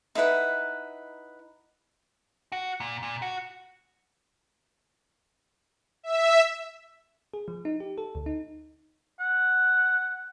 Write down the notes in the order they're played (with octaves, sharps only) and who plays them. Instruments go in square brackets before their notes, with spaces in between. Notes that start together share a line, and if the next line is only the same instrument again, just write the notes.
[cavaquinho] D#4 E4 B4 F#5
[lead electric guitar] F#4
A#2
A#2
F#4
[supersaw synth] E5
[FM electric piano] G#4
F3
D#4
G4
A4
D2
D#4
[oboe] F#5